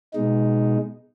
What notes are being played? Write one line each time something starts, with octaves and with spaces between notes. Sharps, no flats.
B2 G#3 D#4